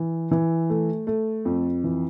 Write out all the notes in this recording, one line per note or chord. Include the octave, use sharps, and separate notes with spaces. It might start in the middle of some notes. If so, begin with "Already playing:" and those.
Already playing: E3
E3
A3
A3
F2
E3